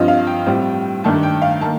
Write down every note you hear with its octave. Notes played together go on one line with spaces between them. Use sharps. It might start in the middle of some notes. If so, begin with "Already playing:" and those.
Already playing: G2 F3 C4 F4 D#5
F5
G5
A2 G3 C4 F4
G2 D#3 A3 D4 A5
G5
F5
D#3 A#3 A5